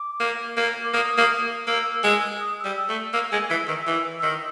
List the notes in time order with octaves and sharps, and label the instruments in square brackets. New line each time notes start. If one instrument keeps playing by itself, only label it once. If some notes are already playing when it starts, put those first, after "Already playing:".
Already playing: [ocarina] D6
[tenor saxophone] A#3
A#3
[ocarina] D6
[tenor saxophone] A#3 [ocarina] D#6
[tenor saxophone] A#3
[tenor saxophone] A#3 [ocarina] E6
[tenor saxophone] G#3
[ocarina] D#6
E6
[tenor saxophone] G3
[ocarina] E6
[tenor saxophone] A3
[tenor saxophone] A#3 [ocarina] E6
[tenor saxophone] G#3
[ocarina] E6
[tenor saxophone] E3
[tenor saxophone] D#3 [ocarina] E6
[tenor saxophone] E3
[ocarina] E6
[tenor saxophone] D#3 [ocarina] E6